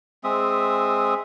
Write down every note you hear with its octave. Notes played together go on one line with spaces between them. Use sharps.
G#3 C4 E5 D#6